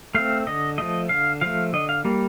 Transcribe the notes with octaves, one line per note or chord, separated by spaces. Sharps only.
A3 C4 F5
D3 D#5
F3 A3 D#5
D3 F5
F3 A3 F5
D3 D#5
F5
G3 A#3